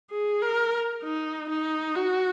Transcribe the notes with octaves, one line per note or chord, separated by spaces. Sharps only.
G#4
A#4
D#4
D#4
F#4